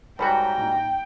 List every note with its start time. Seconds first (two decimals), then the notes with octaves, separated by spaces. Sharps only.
0.19 G#2 G3 F#4 A#4 C#5 G5 A#5 B5
0.58 A#2 D#4